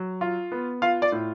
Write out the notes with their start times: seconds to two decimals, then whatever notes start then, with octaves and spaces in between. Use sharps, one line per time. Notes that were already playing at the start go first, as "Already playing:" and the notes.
Already playing: F#3
0.21 F4
0.52 B3
0.82 F4 F5
1.02 D5
1.12 A2